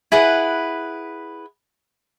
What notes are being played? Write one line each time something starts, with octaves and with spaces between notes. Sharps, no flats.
E4 G#4 B4 F#5